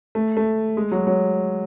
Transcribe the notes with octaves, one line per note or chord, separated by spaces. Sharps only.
A3
A3
G#3
F#3
F#3